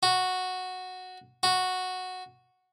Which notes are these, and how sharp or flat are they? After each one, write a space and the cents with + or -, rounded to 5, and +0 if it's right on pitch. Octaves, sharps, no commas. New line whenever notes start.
F#4 -5
F#4 -5